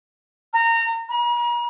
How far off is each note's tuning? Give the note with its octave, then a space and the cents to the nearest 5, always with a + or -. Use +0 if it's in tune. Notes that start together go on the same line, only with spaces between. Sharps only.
A#5 -25
A#5 +45